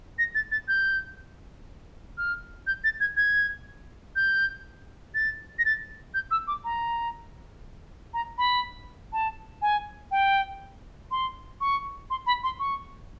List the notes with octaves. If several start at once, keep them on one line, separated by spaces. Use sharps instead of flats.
A#6
A6
A6
G6
F6
G6
A6
G#6
G#6
G6
A6
A#6
A6
G6
E6
D6
A#5
A#5
B5
A5
G#5
G5
C6
C#6
C6
B5
C6
C#6